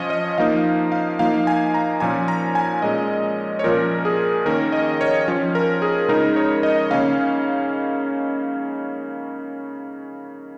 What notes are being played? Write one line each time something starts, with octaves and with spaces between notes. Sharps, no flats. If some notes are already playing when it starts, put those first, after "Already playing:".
Already playing: F3 C#4 C#5 D#5
D#5
F3 A#3 D#4 F5
F5
F3 A#3 D#4 F5
G#5
A#5
A#2 F3 C#4 G#5
A#5
G#5
A#2 G#3 C#4 D#5
C#5
A#2 F3 C#4 A#4
G#4
D#3 A#3 C#4 A#4
D#5
C#5
F3 C#4
A#4
G#4
C#3 G#3 D#4 A#4
C#5
D#5
C#3 A#3 C#4 F5